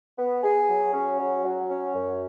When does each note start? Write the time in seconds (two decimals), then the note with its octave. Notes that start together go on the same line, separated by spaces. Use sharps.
0.18 B3
0.43 G#4
0.68 F#3
0.93 C#4
1.18 F#3
1.43 F#3
1.69 C#4
1.94 F#2